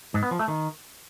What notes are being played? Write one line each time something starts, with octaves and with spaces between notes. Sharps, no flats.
G#2
B3
F3
A3
D#3